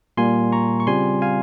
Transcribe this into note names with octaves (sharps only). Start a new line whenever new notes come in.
A#2 G3 A#3 G#5 C6
A#5 C#6
C#6
C#3 G3 C4 F4 G#5 C6
F5 G#5